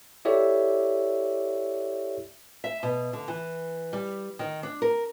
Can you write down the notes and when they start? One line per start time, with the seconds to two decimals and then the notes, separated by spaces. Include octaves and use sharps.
0.25 E4 G4 A4 C#5 D5 E5
2.64 E5
2.83 B2
3.13 D3
3.28 E3
3.93 G3
4.39 D#3
4.63 D4
4.82 A#4